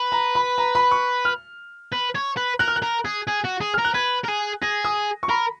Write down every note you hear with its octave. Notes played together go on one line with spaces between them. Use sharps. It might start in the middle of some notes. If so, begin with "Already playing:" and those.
Already playing: B4
A#5
B5
A#5
B5
C#6
F6
B4
C#5
B4
A#4 F#6
F6
F#6
A#4
G#4
G#4
F#4
G#4
A#4 F6
F#6
B4 G#6
A#4
G#4
G#4 A#6
D#6
C#6
A#4 B5